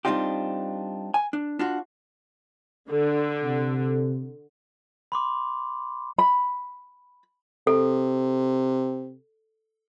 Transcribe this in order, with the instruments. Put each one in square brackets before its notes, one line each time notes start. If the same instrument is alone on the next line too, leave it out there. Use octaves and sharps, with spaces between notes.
[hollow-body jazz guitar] G3 C4 D4 D#4 F4 G4
G#5
D4
D4 F4 F#4
[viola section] D3
[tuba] C3
[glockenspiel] B5 C6 D6
[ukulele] B5
[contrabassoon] C3 [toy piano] A4